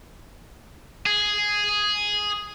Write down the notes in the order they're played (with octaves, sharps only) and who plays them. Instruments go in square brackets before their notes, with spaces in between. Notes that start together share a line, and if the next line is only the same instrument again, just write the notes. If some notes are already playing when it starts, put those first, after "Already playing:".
[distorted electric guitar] G#4